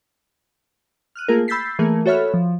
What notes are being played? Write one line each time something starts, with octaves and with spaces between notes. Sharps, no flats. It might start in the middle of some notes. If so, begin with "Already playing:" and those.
F6 F#6 D#7
A3 A#3 F4 G#4 A#4
B5 E6 G6 A6 B6 C7
E3 A3 A#3 G#4 A#4
F#4 A4 C#5 E5 B5 F6
F3